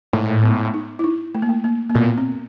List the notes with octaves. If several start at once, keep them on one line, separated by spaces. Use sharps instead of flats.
A2 A3
B3
D#4
E4
D#4
A3
A#3
A3
A#3
A#3
A#2 B3
C4